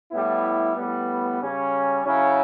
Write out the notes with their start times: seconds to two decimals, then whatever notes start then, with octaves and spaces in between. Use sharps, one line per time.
0.12 A2 G3 B3 E4
0.76 A2 G3 B3
1.40 C#3 G3 C#4
2.04 C#3 F#3 C#4 E4